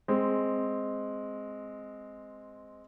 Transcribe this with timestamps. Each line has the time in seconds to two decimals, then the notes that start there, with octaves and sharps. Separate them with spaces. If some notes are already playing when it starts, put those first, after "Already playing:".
0.08 G#3 C4